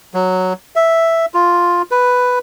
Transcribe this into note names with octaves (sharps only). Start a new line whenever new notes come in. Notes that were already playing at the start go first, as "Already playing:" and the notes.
F#3
E5
F4
B4